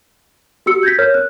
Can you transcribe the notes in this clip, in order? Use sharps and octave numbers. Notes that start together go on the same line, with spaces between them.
F#4 G4 E6 C#7
G6 G#6 A#6 B6
A#4 C#5 F6 G6
F#6